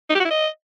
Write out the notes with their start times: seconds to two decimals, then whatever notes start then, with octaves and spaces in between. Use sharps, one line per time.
0.10 D#4
0.15 G4
0.20 F#4
0.25 E4
0.30 D#5